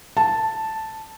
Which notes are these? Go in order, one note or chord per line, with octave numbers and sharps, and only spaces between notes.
A5